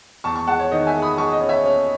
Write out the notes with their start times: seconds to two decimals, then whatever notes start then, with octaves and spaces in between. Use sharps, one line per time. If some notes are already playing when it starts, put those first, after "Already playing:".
0.24 E2 A5 C#6
0.36 A5 C#6
0.47 G#3 F#5 A5
0.60 C#5
0.71 D#3 D#5
0.87 E5 G#5
0.94 G#3
1.02 B5 D#6
1.18 G#3 A5 C#6
1.33 D#5
1.41 C#4
1.49 C#5 E5
1.65 C#4